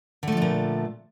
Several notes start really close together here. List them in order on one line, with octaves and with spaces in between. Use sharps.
D3 A3 F3 D4 A#2